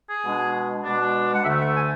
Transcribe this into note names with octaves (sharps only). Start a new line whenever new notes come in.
G#4
B2 G#3 D4
B2 G#3 D4
F#5
D2 D3 A3 E5
F#5
G#5